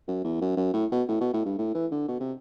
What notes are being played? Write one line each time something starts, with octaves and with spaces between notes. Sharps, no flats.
F#2
E2
F#2
F#2
A2
B2
A2
B2
A2
G2
A2
E3
D3
B2
C3